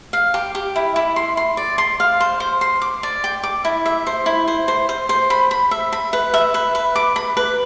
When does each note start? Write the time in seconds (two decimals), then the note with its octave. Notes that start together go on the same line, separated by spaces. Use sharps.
0.13 F5
0.34 G4
0.55 G4
0.76 E4
0.96 E4
1.16 C6
1.37 C6
1.57 D5
1.78 C6
2.00 F5
2.20 C5
2.40 C5
2.61 C6
2.82 D6
3.03 D5
3.24 G5
3.43 D6
3.65 E4
3.86 E5
4.06 C5
4.26 E4
4.48 C5
4.68 C5
4.89 C5
5.09 C5
5.30 B5
5.51 B5
5.71 E5
5.92 B5
6.13 B4
6.34 E5
6.54 B4
6.75 B4
6.95 D6
7.16 B5
7.37 B4